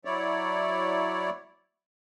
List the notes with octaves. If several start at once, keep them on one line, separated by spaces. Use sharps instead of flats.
F#3 E4 C#5 D5